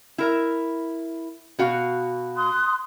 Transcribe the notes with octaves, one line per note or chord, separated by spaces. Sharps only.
E4 A#4 E5
B2 F#4 F5
C6 D#6 F#6